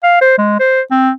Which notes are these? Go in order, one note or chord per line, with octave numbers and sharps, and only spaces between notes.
F5
C5
G#3
C5
C4